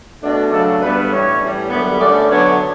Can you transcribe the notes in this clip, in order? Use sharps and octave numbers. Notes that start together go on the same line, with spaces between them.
B2 A3 D4
C#3 F#3 A3 D4 A4
G2 D3 G3 B3 B4
A2 E3 G3 C#4 C#5
A2 E3 G3
F#2 D3 G3 B3
D3 A3 C#4 D5
D3 F#3 B3 D4 C#5